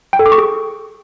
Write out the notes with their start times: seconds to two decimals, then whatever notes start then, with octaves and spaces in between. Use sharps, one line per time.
0.13 G5
0.19 A4
0.26 D6
0.32 C#6
0.38 G#4